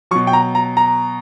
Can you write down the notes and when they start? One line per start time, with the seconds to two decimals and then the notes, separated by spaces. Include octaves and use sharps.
0.11 F#3 C#6
0.15 B2
0.27 G5
0.33 A#5
0.55 A#5
0.77 A#5